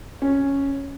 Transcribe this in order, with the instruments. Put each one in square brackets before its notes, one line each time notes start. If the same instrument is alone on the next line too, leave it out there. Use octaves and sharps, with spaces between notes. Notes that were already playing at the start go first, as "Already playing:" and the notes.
[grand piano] C#4